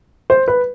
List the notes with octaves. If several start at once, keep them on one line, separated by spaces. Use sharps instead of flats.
C5
B4